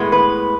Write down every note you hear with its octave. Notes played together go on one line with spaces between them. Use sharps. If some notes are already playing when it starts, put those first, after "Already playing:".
Already playing: A2 G#3 B3
B4